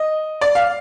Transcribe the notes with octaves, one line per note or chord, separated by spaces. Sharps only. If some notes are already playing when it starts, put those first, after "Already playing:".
Already playing: D#5
D5
F5